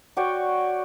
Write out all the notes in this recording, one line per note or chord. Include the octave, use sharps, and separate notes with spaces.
F#4 C#5 D5 G5